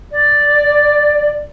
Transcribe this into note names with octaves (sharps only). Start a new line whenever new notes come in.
D5